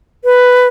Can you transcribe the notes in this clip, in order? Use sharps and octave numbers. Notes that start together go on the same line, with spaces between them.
B4